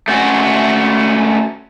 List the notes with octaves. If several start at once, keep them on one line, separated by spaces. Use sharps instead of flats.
A3 C#4 F#4